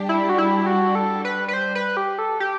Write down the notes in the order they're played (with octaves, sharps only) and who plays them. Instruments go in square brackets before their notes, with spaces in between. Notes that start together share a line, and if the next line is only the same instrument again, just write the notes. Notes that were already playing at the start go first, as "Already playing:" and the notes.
Already playing: [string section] G3 D4 G4
[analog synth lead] E4
F#4
E4
F#4
A4
B4
B4
C5
B4
G4
A4
G4